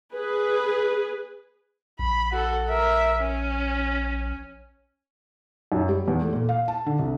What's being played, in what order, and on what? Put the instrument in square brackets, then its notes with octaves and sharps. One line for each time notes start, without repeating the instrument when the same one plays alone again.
[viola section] G#4 B4
[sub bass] A#1 [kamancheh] B5
[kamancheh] F#4 A4
A#4 E5
C#4
[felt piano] F#2
G3
E2
A3
A#2
F5
A5
D3
C2